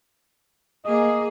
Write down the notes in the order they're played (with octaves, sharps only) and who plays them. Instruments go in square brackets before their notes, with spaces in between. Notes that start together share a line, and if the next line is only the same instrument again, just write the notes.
[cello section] A#3 G#4 [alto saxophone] D#5